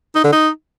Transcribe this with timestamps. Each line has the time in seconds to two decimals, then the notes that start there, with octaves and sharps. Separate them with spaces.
0.15 D#4
0.24 D3
0.33 D#4